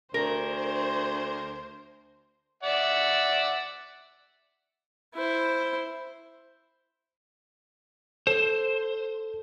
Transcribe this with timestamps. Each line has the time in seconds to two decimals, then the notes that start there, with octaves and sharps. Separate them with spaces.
0.14 D2 A#4 C5
2.63 D5 E5 F#5
5.15 E4 C5
8.27 A4 C5